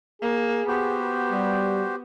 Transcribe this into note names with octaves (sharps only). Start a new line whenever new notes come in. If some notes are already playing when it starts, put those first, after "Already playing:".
A#3 G#4
B3 F#4 G4 C5
G3